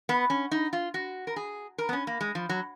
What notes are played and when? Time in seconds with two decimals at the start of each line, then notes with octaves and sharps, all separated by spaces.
0.09 B3
0.30 C#4
0.51 D#4
0.73 F4
0.94 F#4
1.27 A#4
1.36 G#4
1.78 A#4
1.89 B3
1.93 C#4
2.07 A#3
2.21 G#3
2.35 F3
2.49 F#3